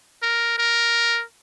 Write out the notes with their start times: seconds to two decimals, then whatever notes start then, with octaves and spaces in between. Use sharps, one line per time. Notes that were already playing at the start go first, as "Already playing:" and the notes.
0.23 A#4
0.59 A#4